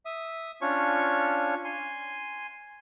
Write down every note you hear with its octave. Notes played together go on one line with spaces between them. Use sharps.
E5 D#6
C#4 D4 F4 C#5 C#6
G#5 C6